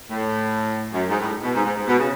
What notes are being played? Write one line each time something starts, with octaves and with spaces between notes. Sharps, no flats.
A2
F#2
G#2
A2
B2
G#2
G#2
G#2
B2
C#3